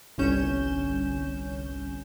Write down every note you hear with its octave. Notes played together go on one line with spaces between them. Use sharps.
G1 C2 G2 C#4 G6 E7